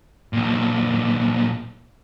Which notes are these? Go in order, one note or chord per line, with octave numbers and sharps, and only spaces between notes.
B1 A#2